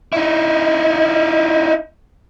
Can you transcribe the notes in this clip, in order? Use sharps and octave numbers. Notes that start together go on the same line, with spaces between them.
D#4 E4